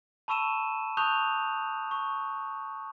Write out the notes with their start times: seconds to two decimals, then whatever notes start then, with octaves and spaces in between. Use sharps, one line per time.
0.28 A5 B5 C#6 E6 D#7 E7
0.97 A5 C#6 D#6 F#6 G6 F7
1.91 C#6